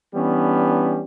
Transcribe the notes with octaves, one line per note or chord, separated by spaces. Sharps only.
E3 G3 B3 C#4 D4